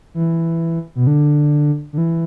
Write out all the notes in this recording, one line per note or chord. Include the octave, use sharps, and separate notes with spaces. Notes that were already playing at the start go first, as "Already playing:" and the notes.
E3
B2
D3
D3
E3